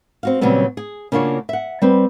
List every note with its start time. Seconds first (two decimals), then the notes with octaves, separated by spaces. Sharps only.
0.23 C4 F#4 F5
0.41 A#2 C#3 F#3 G3 B3 C4
0.77 G#4
1.12 C#3 A#3 D4 F4 F#4 C#5
1.49 E5 F#5
1.82 G3 C4 B4